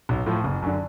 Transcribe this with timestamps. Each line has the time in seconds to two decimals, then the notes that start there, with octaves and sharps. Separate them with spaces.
0.09 B1
0.26 A2 F3
0.44 F#1
0.62 F#2 D3